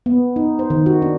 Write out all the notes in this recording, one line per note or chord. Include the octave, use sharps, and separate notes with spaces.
B3
D#4
C5
D#3
F#4
D4